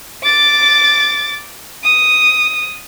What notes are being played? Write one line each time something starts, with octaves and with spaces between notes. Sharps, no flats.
D6 A6
D#6